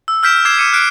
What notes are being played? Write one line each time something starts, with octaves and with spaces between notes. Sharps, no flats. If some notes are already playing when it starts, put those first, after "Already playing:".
E6
E6 F6 G6 B6 D7 E7
D6 G#6 C7 E7
D6 F6 C#7 D#7
F6 F#6 C7 D7